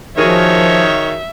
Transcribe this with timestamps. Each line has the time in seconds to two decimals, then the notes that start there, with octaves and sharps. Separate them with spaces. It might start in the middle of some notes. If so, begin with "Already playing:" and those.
0.17 D#3 F3 F#4 G#4 A#4 C#5 E5